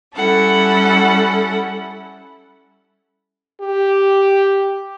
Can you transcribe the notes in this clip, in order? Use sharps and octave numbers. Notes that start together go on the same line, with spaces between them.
G3 C#4 E4 A4 F#5
G4